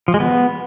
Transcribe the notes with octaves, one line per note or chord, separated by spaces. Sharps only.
F3
G#3
B3